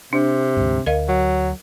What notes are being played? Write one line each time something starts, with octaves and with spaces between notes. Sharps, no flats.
C3 D4
D2 G#2
D2 A#4 D#5 F5
F#3